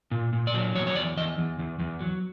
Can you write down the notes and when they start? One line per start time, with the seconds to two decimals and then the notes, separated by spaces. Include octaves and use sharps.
0.11 A#2
0.33 A#2
0.47 D5
0.54 F#3
0.75 E2 C#5
0.87 C#5
0.95 E2 D5
1.17 E2 D#5
1.38 E2
1.59 E2
1.79 E2
2.01 F#3